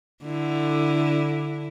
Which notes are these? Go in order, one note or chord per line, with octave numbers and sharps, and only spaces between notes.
D3 E4